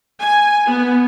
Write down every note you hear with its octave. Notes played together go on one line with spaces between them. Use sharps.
G#5
B3